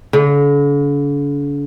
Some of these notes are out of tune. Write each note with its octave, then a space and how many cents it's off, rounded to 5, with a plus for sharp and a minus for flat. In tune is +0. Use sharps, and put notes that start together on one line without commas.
D3 -45